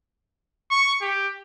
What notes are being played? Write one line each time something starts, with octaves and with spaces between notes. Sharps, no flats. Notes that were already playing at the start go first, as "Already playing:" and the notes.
C#6
G4